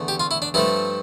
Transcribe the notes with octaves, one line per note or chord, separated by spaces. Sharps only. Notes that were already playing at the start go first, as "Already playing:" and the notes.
Already playing: E2 D3 A3
G4
F4
E4
D4
G2 F3 A3 E4